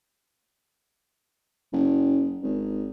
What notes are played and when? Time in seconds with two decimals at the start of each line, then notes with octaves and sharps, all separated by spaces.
1.72 F#1
2.43 G#1